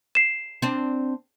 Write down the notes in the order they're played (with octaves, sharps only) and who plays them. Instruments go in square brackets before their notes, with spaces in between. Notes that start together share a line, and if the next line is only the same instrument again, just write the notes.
[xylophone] C7 E7
[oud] C4 D4